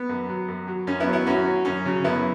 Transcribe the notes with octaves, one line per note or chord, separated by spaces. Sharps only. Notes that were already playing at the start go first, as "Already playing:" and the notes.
Already playing: B3
F#2
F#3
F#2
F#3
F#2 C#4
B3 E4
F#3
B3 E4
F#2 C#4 F#4
F#3
F#2 C#4
C#3 F#3
F#2 B3 E4